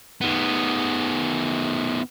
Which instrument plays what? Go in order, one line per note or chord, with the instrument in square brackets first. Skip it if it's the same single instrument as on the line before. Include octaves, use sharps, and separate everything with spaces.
[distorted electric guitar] D#3 B3